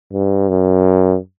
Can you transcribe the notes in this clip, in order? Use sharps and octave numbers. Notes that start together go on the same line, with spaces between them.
G2
F#2